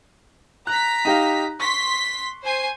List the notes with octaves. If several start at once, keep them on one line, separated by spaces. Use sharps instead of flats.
A#5 F#6 B6
D#4 G4 F5
C6 C#6 B6
C5 G#5 C7